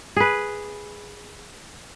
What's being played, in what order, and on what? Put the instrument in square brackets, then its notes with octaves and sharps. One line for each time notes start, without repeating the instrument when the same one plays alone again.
[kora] G#4 B4